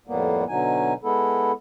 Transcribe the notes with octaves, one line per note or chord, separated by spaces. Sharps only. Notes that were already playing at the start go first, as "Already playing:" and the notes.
F2 A2 G3 A#3 B3
B2 D3 F#3 D#4 G#5
G#3 B3 E4 A4